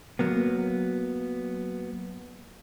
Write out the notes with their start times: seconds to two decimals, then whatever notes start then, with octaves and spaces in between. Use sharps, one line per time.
0.19 F#3 A#3 B3